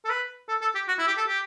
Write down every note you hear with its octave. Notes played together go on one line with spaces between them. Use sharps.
A4
B4
A4
A4
G4
F#4
E4
G4
A4
G4